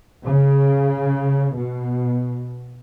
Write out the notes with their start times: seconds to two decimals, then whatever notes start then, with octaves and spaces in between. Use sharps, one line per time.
0.25 C#3
1.55 B2